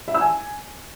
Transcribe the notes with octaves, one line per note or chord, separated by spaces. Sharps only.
E5
E6
G#5